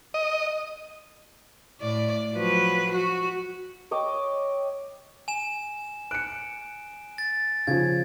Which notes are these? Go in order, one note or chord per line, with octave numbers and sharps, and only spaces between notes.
D#5
A2 D5
F3 F#3 B4
F#4
C#5 D#5 G5 D6
G#5 E7
F#6 C#7 D7
A6
C#3 F3 G#6